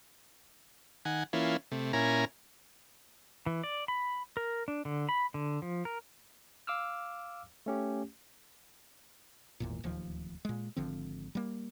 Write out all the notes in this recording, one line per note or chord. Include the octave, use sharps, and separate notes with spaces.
D#3 F#5 G#5
E3 A#3 C#4 E4 F4
C3 A3
A#2 C#4 E4 A#4 G#5 A#5
E3
D5
B5
A#4
D4
D3
B5
D3
F3
A#4
F5 D6 E6 F6
A3 C#4 G4
G#1 E2 A#2
D1 D#2 F3
A#2 G#3
G#1 D3 F3 C4
G3 A#3